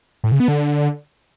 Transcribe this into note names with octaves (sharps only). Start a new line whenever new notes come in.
A2
C#3
B3
D3